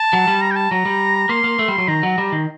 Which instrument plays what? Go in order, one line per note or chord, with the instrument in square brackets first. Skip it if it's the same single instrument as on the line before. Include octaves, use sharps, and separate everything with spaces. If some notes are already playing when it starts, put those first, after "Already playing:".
Already playing: [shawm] A5
[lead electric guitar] F#3
G3
[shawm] A#5
G5
A5
[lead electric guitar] F#3 [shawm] A#5
[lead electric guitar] G3
[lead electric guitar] A#3 [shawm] C6
[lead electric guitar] A#3
A3
G3
F#3
[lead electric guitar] D#3 [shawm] A#5
[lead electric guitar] F#3
G3
D#3